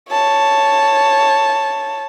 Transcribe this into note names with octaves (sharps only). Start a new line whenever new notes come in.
C#5 A5